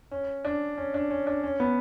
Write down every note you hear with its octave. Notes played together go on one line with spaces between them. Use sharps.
C#4
D4
C#4
D4
C#4
D4
C#4
B3